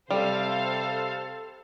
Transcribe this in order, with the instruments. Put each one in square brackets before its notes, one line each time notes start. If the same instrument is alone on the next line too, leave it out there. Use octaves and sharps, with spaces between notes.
[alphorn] C3 [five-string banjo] G3 [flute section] A4 [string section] C5 F5